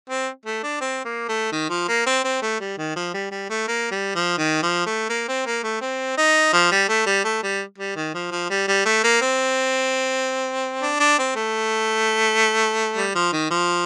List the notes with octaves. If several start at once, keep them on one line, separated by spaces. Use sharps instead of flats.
C4
A3
D4
C4
A#3
A3
D#3
F3
A#3
C4
C4
A3
G3
D#3
F3
G3
G3
A3
A#3
G3
F3
D#3
F3
A3
A#3
C4
A#3
A3
C4
D#4
F3
G3
A3
G3
A3
G3
G3
D#3
F3
F3
G3
G3
A3
A#3
C4
D4
D4
C4
A3
G3
F3
D#3
F3